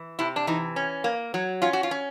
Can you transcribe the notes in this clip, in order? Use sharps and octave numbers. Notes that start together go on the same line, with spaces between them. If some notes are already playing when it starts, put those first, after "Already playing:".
Already playing: E3
C3 E4
D4
E3 D#4
C#4
A#3
F#3
C#4 F4
F#4
F4
C#4